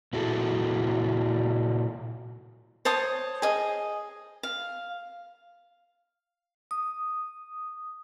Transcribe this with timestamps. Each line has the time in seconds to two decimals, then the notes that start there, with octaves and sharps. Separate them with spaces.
0.13 A#2 E4 F#4 G#4 A4
2.85 C5 C#5 A5 D#6
3.42 G#4 D#5
4.43 F5
6.71 D#6